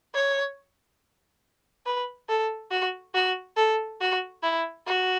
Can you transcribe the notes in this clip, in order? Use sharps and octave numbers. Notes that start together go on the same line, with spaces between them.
C#5
B4
A4
F#4
F#4
A4
F#4
E4
F#4